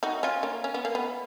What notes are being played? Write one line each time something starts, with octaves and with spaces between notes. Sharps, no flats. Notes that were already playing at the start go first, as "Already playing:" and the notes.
D#4 F#4
C#4 F4
A#3 C#4
C#4
B3
A#3
B3